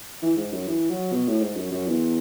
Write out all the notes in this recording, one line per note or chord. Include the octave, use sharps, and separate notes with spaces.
E3
G#2
F#2
E3
F#3
B2
A2
G#2
F#2
F#2
E2